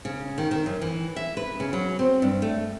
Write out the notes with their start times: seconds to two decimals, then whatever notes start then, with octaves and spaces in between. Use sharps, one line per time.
0.05 C#3
0.38 D#3
0.51 D#3
0.66 F#2
0.81 E3
1.16 E5
1.37 B4
1.60 C#3
1.73 F#3
1.99 C4
2.22 G2
2.42 A3